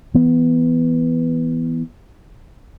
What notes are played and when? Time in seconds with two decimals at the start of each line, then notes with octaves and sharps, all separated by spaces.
0.14 E3 B3